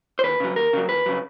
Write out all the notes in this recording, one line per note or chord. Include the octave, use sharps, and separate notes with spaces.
C5
D#2 B4
C#3 F#3
D#2 A#4
C#3 F#3
D#2 B4
C#3 F#3